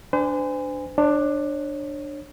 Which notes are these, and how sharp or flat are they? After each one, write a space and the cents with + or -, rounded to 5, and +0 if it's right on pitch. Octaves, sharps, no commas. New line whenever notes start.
D4 +0 C5 -40 G#5 -20
D4 +15 C#5 -25